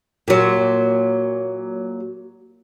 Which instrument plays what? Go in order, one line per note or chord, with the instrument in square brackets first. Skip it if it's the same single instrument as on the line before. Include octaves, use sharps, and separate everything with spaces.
[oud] A#2 F#3